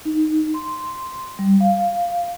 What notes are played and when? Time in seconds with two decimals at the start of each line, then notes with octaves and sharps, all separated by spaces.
0.05 D#4
0.54 C6
1.39 G3
1.60 F5